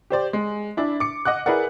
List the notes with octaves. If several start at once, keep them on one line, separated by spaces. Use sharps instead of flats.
G4 C5 D5
G#3
D4 E4
D6 C#7
D#5 F#5 D6 F#6
E4 G#4 A#4 B4 D5 F#5